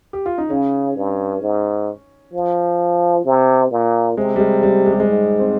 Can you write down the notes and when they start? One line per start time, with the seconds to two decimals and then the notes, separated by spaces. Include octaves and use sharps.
0.13 G4
0.26 F4
0.38 D#4
0.50 C#3 C#4
0.96 G2
1.42 G#2
2.34 F3
3.25 C3
3.71 A#2
4.17 C3 G#3
4.36 G3
4.40 G#3
4.63 G3
4.86 G#3
4.93 G3
5.00 G#3
5.09 G#2
5.39 C4